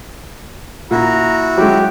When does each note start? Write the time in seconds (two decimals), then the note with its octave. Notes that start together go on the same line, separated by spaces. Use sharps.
0.91 A#2 E4 F#4 A#5
1.57 F#3 G#3 G4